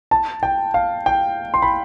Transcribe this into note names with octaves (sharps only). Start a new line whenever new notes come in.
A5
G5
F5
G5
C6
B5